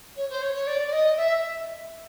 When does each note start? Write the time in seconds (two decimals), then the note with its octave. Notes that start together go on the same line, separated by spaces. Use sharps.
0.16 C#5
0.29 C5
0.41 C#5
0.54 C#5
0.67 D5
0.87 D5
0.92 D#5
1.16 E5